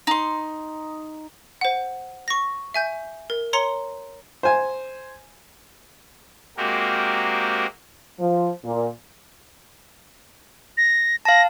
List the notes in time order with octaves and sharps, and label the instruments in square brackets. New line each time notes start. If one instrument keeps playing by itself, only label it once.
[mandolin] D#4 C6
[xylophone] C5 F#5
C#6 A#6
E5 G#5 G6
A#4
C#5 A#5 C6 C#7 G7
[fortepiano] C5 G#5
[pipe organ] G#3 A#3 C4 F#4 G4 A#4
[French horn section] F3
A#2
[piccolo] A#6
[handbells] F5 A5 [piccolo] A#6